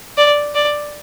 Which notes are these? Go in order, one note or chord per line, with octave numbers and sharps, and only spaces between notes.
D5
D5